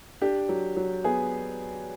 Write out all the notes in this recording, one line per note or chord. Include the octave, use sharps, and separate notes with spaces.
D4 G4
F#3
F#3
B3 G#4